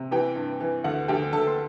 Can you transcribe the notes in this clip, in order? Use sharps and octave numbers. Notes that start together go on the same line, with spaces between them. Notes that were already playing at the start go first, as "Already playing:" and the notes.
Already playing: C3
E3 G4 G5
G2
E3
D2 F#5
D2 G4 G5
D2 A4 A5
C6